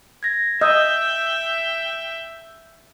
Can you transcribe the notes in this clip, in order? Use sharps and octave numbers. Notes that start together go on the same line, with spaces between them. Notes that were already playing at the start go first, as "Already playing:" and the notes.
G#6 A#6
D#5 E5 G5 E6 G6